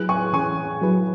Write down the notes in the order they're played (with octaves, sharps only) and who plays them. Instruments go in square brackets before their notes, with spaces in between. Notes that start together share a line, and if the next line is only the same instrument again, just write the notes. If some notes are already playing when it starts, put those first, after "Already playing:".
Already playing: [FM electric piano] F#3 E4 G#4 B4 [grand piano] F#6
[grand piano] G#5 C#6
[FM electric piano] E3 C#4 G#4 [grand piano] G#5 C#6
[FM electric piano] F#3 E4 G#4 B4